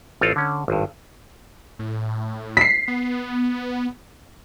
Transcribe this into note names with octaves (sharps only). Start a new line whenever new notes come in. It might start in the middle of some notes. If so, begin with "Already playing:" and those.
A1 C4 F4 A4 F5
D3 C#4
G#1 G2
A2
B6 C7
B3